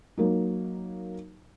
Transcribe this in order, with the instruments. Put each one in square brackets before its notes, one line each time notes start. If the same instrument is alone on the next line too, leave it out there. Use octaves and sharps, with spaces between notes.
[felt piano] F#3 A#3 D#4